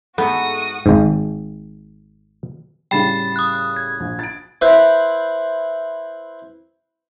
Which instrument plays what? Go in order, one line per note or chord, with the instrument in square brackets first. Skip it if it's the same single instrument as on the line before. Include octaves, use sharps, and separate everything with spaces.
[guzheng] G#2 A3 E4 [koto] B3 [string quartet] F#4 D#6 [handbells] A4 F#5
[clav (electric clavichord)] G#1 G#2
[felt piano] A2 C#3 G3 [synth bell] G5 B5 A6
[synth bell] D#6 F#6
G#6
[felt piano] A#1
A6 D7
[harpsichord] E4 B4 C5